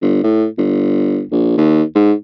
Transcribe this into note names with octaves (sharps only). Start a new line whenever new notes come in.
G1
A2
G1
A#1
D#2
G#2